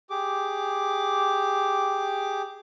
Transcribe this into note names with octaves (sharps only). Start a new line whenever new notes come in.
G4 G#4 D6